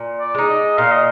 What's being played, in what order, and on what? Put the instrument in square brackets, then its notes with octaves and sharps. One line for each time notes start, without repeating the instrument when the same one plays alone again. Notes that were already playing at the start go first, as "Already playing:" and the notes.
Already playing: [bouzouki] A#2
[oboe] D5
[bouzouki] G#3 D#4
[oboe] D#5
[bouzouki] A#2 [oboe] F5
[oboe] D#5